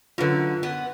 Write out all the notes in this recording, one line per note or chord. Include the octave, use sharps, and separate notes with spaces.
F#2 D3 F4 B4
B3